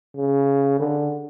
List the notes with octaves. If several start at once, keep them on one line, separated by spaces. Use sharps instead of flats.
C#3
D3